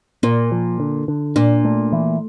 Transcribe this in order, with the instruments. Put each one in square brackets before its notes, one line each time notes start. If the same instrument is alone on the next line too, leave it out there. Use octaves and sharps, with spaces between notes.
[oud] A#2 [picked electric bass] A#3
[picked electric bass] F3
D3
D3
[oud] A#2 [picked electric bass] D4
[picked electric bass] A3
E3